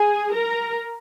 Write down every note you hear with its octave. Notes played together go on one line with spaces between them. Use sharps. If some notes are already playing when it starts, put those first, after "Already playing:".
Already playing: G#4 G#5
A#4 A#5